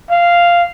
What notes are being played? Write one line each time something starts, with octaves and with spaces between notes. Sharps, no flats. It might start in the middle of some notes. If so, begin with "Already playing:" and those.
F5